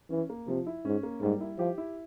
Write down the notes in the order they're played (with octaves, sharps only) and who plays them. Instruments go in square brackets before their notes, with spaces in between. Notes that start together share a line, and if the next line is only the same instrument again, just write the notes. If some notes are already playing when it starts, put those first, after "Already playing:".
[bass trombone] E3 [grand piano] C#4
[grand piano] A#3
[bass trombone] C3 [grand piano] F3
[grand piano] E4
[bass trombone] G#2 [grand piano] C#4
[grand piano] A#3
[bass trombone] G#2 [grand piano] G3
[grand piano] E4
[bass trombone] F3 [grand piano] G4
[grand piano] E4